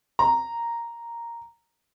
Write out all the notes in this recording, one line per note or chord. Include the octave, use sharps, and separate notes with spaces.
A#5